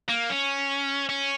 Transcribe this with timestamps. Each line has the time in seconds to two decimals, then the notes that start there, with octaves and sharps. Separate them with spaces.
0.09 A#3
0.30 C#4
1.09 C#4